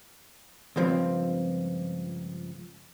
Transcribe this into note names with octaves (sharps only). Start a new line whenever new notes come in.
C#2 G2 F3 C4